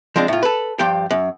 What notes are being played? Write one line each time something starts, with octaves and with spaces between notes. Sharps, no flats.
F3 G#3 C4 D4
A2 F4
A4 B4
G2 F3 G4 G5
F#2